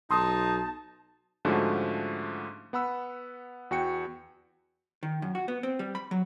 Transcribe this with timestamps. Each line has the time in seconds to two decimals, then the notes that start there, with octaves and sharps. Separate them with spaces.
0.11 B1 D#4 A5 C6 D#6
1.45 G#2 D3 F3 A3 C#4 F#4
2.73 B3 F#5 B5 E6
3.71 E2 F#4 G5 C#7
5.03 D#3
5.22 F#2
5.35 F#4
5.48 B3
5.63 C4
5.79 G3
5.95 B5
6.11 F#3